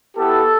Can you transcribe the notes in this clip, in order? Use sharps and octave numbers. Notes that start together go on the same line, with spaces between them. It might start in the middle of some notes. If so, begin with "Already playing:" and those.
B3 E4 G4 A4